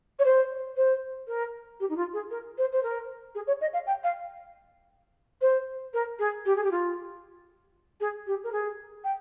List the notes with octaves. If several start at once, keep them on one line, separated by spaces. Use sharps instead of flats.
C#5
C5
C5
A#4
G4
D#4
F4
G#4
A#4
C5
C5
A#4
G#4
C#5
D#5
F5
G5
F5
C5
A#4
G#4
G4
G#4
G4
F4
G#4
G4
A#4
G#4
G5